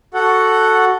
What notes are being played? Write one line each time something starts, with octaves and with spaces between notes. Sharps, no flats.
F#4 A4 F#5